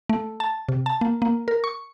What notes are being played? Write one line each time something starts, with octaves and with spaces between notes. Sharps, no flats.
A3
A5
C3
A5
A#3
A#3
A#4
C#6